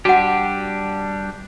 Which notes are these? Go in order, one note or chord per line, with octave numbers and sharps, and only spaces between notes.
G3 D4 F#4 G4 F#5